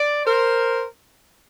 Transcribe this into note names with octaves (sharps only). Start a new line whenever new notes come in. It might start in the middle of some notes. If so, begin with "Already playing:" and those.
Already playing: D5
A#4 C5